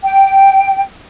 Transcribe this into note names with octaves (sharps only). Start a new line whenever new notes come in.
G5